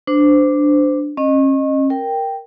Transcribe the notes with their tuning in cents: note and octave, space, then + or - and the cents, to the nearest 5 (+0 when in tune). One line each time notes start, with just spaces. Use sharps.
D4 +0 C5 -25
C#4 -35 D#5 -15
A#4 +0 G5 +0